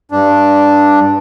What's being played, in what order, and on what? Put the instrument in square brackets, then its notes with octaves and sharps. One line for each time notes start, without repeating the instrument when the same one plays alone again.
[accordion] G2 D4